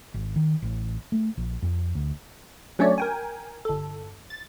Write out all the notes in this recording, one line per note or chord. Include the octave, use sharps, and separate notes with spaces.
G#1
D#3
A1
A3
A#1
F2
D2
F#3 A3 C#4 D4 C#5 D5
A#4 G5 G#5
G1 A4
A6